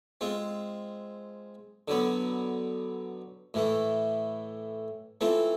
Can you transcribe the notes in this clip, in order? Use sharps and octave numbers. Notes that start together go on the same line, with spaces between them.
G#3 C4 F4
D3 F#3 B3
A2 E3 A3
E3 A3 C4 F4